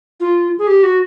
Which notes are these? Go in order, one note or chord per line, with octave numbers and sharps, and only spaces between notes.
F4
G#4
G4
F#4